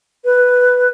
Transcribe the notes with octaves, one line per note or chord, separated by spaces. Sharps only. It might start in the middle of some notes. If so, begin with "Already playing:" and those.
B4